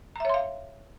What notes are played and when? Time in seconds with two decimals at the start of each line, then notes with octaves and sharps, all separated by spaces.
0.16 A#5
0.20 E5
0.25 C#5
0.29 C6
0.34 F5